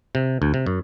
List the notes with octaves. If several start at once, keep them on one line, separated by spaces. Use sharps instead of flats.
C3
D2
C3
F#2